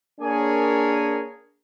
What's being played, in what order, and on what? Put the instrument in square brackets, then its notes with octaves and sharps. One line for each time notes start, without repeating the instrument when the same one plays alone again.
[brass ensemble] A#3 D4 G#4 A#4 C#5 G#5